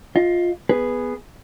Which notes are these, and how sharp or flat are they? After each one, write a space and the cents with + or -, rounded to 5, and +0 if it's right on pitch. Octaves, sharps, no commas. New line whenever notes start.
F4 +10 D#5 +30
B3 +0 G#4 +0 B4 +0